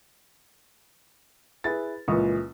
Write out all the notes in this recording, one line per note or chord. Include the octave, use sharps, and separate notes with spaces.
E4 G#4 B4 A6
C#2 A#2 E3 F3 C#6 D#6